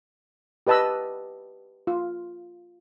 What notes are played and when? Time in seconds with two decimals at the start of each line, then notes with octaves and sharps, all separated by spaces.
0.67 G4 B4 D#5 A5 B5 E6
1.87 F4